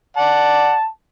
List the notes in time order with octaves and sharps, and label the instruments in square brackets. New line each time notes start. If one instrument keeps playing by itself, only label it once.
[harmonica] D5 F#5 [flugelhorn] A5